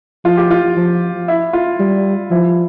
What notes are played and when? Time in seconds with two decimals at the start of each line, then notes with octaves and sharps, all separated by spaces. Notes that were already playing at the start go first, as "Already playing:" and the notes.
0.25 F3 F4
0.37 G4
0.50 F4
0.77 F3
1.28 E4
1.53 F4
1.80 G3
2.31 F3 E4